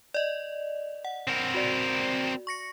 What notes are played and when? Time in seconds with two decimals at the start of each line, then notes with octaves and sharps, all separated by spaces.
0.14 D5 D#5
1.05 F#5
1.28 C4 A#4
1.54 F#4 D5
2.47 C#6 A#6 C#7